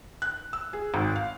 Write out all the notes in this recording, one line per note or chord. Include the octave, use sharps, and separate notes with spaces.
F#6
E6
G#4
G#1
F5